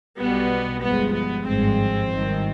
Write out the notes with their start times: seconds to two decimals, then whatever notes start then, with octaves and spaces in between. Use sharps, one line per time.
0.19 B1 B2 G3 B3
0.82 G1 G2 F3 G#3 B3
1.14 B3
1.46 G#1 G2 F3 G#3 C4
2.10 G#1 G2 D#3